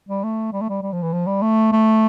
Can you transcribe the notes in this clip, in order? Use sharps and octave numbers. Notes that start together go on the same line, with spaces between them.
G3
A3
G3
A3
G3
G3
F3
E3
F3
G3
A3
A3